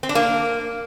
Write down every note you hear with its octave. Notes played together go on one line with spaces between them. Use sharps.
C4
D4
A#3